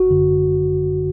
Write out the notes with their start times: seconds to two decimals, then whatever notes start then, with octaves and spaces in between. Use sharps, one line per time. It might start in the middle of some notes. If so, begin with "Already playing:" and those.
Already playing: G1 F#4
0.10 F#2 D3